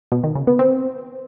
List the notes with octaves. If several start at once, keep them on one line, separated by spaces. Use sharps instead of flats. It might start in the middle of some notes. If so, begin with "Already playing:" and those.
B2
D#3
C#3
B3
C4